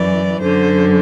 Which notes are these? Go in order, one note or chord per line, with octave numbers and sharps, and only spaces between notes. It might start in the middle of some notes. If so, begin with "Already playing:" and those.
Already playing: F#2 E3 D5
F#2 D3 C5